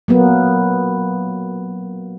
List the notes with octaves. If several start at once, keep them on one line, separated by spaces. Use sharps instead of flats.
F#3 A#3 B3